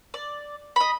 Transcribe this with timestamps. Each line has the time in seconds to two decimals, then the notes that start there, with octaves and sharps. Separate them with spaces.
0.14 D5
0.76 D#5 B5